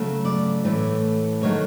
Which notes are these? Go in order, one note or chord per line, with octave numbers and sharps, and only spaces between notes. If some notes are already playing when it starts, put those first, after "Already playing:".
Already playing: C#3 F#3 A3
D5
A2 E3 A3
D#3 F#3 A3 C#5